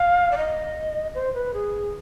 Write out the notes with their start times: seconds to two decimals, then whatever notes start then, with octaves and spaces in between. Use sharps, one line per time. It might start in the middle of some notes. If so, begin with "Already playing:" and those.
Already playing: F5
0.32 D5
0.37 D#5
1.15 C5
1.34 B4
1.54 G#4